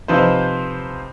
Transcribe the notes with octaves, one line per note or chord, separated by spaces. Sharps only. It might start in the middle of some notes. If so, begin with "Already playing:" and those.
C3 F3 D#4 B4 C5